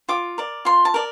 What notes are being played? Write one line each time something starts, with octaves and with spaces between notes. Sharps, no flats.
F4 D6
A#4 D5
F4 C6
A5
A#4 D5